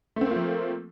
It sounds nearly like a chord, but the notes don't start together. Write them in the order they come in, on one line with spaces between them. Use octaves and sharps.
A3 C4 A#3 F4 F3